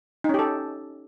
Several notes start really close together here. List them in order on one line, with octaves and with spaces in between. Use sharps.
D#4 C#4 G4 A4